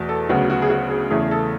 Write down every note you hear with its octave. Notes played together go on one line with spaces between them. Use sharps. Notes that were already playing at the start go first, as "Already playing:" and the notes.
Already playing: E2 B2 A3
A4
D2 C#3 F#3 B3 F#4
F#4
G#4
F#4
G#4
E2 C#3 E3 A3 G#4
A4